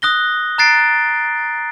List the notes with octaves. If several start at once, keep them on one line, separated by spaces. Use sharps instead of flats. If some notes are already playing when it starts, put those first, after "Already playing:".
D#6 F#6 A#6 G7
A#5 F#6 A6 C7 D7